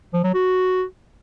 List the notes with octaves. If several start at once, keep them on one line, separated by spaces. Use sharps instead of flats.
F3
F#3
F#4